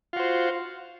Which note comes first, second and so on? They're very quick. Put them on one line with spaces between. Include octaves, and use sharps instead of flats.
F4 F#4 C5